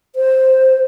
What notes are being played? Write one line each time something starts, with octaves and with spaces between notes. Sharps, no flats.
C5